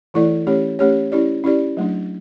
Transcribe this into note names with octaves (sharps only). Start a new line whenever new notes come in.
E3 A3 E4 A4 D5
A3 C#4 G4 C#5
A3 C#4 G4 C#5
C#4 E4 G4 D5
C#4 E4 G4 D5
F#3 A3 D4